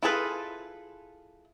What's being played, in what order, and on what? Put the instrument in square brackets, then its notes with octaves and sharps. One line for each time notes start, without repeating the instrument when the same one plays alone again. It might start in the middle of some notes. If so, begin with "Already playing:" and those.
[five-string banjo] E4 F4 G#4 A4 B4